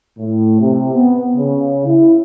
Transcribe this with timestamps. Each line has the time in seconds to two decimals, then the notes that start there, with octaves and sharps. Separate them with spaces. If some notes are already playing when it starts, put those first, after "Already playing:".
0.18 A2
0.60 C3
0.93 B3
1.36 C#3
1.86 E4